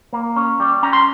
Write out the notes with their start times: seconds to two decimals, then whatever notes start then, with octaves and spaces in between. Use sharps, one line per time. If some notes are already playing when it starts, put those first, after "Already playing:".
0.13 A#3
0.36 C#4
0.60 G3
0.83 C#4 A#5
0.93 C6